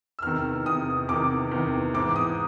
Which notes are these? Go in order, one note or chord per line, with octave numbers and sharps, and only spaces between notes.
E6
E2 C3 D#3 F6
E2 C3 D#3 D#6
E2 C3 D#3 D6
E2 C3 D#3
G#2 E3 D6
D#6